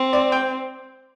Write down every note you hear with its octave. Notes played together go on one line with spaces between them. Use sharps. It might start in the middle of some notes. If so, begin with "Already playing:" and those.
Already playing: C4
D5
G5